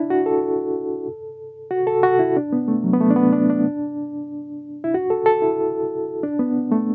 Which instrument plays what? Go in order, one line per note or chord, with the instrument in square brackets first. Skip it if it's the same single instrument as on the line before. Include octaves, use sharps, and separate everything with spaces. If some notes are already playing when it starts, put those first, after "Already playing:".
Already playing: [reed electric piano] D4 E4
F#4
A4
F#4
A4
F#4
E4
D4
B3
A3
F#3
B3
A3
D4
B3
D4
D4
E4
F#4
A4
A4
E4
D4
B3
A3